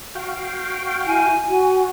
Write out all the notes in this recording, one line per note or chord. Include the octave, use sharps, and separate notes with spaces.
F#4 F5 G5
E4 G#5
F#4